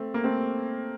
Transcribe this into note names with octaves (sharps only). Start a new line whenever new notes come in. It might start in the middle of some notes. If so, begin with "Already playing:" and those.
Already playing: A3 C4
A#3
A3 C4